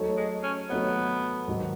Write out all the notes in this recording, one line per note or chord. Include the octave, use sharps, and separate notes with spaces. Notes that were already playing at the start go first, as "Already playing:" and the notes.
Already playing: F#3 A3 D#4 A4 C#5
G#3
C#4
F#3 A3 B3 D#4 A4 C#5
G#2 D#3 F#3